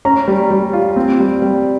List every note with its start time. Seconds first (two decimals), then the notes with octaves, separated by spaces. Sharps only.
0.05 C#4 A#5
0.28 G3
0.51 G3
0.73 F4
0.96 C4
1.20 G3
1.42 G3